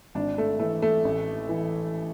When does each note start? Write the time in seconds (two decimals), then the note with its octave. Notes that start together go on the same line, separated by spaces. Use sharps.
0.15 G#1 D4
0.38 A3
0.59 E3 A3
0.82 A3
1.05 A1
1.49 E3